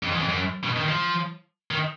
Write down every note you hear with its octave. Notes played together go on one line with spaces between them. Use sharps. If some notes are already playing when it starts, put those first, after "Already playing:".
F2
E2
F2
F#2
B2
D#3
F3
D#3